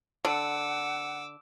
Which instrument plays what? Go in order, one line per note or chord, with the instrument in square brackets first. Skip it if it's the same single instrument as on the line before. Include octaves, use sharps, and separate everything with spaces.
[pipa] D3 [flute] F#5 [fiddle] D6 E6